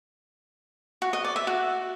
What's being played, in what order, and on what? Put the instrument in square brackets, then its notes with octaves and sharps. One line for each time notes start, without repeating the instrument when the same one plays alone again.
[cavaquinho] F#4
D#5
D5
E5
F#4